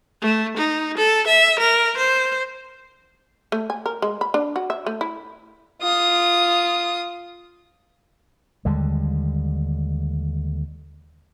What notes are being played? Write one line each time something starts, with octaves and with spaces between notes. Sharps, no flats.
A3
D#4
A4
E5
A#4
C5
A3
G#5
A#4
G#3
B5
D4
F#4
E5
A3
E4
F4 D#6
D#2 D3 G3 G#3